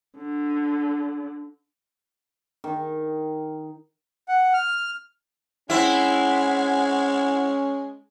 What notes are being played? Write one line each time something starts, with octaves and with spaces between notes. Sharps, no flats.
D3
D#3
F#5
F6
G#3 C4 C#4 E4 F#5